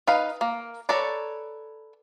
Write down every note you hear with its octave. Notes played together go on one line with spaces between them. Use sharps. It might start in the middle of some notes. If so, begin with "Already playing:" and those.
D#4 B4 F5
A#3
A4 B4 C#5 D5 A#5